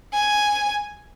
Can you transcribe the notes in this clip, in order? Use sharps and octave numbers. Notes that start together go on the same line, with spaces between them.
G#5